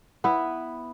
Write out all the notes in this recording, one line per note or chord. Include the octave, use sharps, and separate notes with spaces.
B3 E4 B4